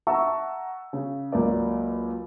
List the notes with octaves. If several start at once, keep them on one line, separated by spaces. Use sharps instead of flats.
E5 F#5 A5 A#5 C#6 E6
C#3
C#2 F#3 A#3 D5